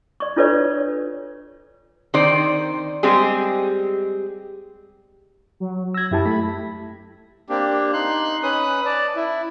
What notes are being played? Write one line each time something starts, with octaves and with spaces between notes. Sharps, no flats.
D5 C#6
D4 F4 A4 B4 C#5 D5
D#3 C4 C5 D5
G3 G#3 C4 G4 G#4
F#3
E6 G#6 A#6
F#2 E4 G4 A5
A3 B5
A#3 C4 D4 G4
D#4 C6 F#6
C#4 B4 D#6 F#6
D5 A5
E4